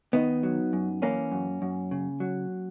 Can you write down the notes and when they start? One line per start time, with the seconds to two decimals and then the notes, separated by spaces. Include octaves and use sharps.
0.13 D#3 B3 D#4
0.43 F#3
0.73 F#2
1.02 E3 A#3 C#4
1.32 F#2
1.62 F#2
1.91 C#3
2.20 F#3